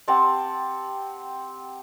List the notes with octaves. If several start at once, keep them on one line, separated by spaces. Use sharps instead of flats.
C4 G4 F#5 A5